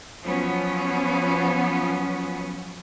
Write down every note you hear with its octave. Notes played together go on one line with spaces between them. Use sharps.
F3 F#3 B3 C#4